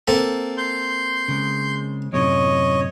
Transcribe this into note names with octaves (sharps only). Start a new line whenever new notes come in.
A#3 C4 A4
C6 G6
C#3 G#3
F#2 A2 C3 C#5 D#5